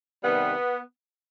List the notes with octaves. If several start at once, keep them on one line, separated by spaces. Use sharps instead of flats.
C3 D#3 G3 B3